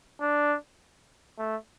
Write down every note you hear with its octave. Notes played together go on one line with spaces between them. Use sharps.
D4
A3